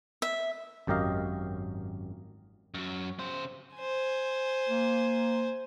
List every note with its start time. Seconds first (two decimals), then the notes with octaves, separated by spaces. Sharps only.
0.22 E5
0.87 G#1 F#2 G4 A#4 D#5 F5
2.74 F#2 F#3
3.19 C#3 C5
3.76 C5 G#5
4.69 A#3